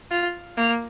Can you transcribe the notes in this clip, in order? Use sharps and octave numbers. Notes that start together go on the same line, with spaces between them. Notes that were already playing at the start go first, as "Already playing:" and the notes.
F4
A#3